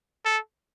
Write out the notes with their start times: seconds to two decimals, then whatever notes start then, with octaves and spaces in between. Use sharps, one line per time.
0.25 A4